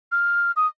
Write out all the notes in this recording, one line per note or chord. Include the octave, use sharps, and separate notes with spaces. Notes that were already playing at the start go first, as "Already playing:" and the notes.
F6
D#6